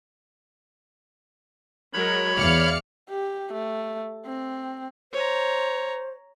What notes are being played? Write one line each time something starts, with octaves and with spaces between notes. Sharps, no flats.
F#3 G#3 A#4 C#5 B5
E2 D5 F5 F6 C#7
G4
A3
C4
C5 C#5 A#5